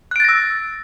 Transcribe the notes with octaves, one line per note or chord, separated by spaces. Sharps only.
E6 F#6 A6 A#6 D7